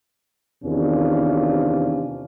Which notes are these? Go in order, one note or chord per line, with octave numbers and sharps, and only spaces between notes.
E2 C3 D#3 C#4 D4 F4